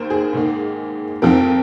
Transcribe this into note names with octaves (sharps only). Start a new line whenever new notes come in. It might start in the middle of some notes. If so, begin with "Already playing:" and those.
Already playing: D#2 D#3 A#4 C5
G#4
G#2 D#3 A#3
F2 F3 C4 A#4